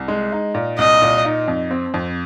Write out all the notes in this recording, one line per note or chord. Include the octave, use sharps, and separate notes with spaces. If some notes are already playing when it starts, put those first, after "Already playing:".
Already playing: C2
G#3
D#4
A#2
C2 D#5
A#2
D#4
F2
C4
F2